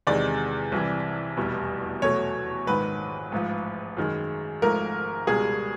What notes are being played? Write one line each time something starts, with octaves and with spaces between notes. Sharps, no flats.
E2 C3 D#3 G#3 D5
C2 C3 E3
F1 E2 B2 G3
E2 B2 F#3 A3 C#5
A#1 G#2 D#3 B4
A1 G#2 F3
F#2 D#3 G#3
G#1 G#2 F3 A3 A#4
C#2 B2 G3 G#4